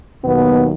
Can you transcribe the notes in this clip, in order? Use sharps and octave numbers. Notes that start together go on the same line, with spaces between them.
D#2 B2 D#3 F#3 B3